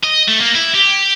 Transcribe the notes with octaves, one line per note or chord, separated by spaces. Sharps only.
D#5
A3
A#3
E4
G4